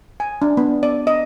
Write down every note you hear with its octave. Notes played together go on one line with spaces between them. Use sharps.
G#5
D4
B3
D5
D#5